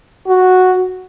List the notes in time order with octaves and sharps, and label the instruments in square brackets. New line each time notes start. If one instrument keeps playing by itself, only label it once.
[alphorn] F#4